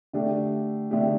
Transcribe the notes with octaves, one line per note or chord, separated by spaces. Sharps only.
D3 A3 D4 G4
D3 A3 D4 G4